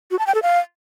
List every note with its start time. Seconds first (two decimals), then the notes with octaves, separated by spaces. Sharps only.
0.11 F#4
0.19 A5
0.27 G5
0.35 A4
0.42 F5